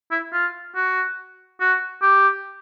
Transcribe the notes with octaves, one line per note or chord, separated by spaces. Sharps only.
E4
F4
F#4
F#4
G4